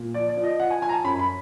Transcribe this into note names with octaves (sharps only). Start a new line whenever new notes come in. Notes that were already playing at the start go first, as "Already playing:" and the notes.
Already playing: A#2
F3 D5
D5
F3
D#5
F3 F#5
G#5
F3 G#5
A#5
A5
F#2 B5
B5